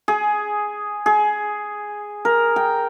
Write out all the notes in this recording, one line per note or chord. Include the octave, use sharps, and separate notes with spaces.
G#4
G#4
A#4
G5